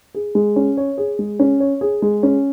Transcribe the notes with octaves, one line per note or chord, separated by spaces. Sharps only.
G#4
G#3
C#4
C#5
G#4
G#3
C#4
C#5
G#4
G#3
C#4